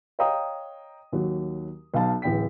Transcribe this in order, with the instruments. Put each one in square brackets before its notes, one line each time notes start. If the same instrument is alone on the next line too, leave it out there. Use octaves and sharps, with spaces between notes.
[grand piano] C#5 D#5 F5 G5 A#5 D#6
D#2 F#3
B1 F5 A5
D1 A1 G5 B6